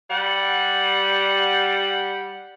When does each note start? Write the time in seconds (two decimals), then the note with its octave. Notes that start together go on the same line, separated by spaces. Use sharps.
0.11 G3 F#5